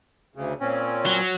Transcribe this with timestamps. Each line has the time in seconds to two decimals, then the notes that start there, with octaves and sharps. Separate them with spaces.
0.35 D2 C#3
0.60 A#2 C4 C#4
1.06 F#3